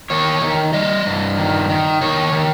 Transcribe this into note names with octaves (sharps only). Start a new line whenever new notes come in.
D#3 C#5
D#3
G3 D#5
G2
D#3
D#3
D#3 C#5
D#3